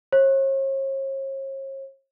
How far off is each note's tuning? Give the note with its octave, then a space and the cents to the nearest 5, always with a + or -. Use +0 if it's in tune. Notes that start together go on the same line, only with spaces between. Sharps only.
C#5 -45